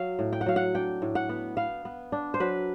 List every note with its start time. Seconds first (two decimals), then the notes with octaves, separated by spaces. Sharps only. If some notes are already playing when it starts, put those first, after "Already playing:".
Already playing: F#3 F5
0.19 A2
0.33 G5
0.41 F#5
0.46 F#3 F5
0.56 F#5
0.74 D4 G5
1.02 A2
1.15 F#5
1.29 B3
1.57 B3 F5
1.85 B3
2.12 D4
2.34 C5
2.40 F#3 B4